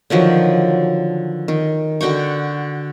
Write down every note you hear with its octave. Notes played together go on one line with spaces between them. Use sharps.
D3 D#3 F3 F#3
D#3
D3 F#4 G5 C#6